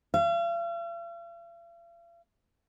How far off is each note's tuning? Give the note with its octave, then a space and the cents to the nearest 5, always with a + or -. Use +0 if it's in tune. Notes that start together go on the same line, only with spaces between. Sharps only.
F5 -45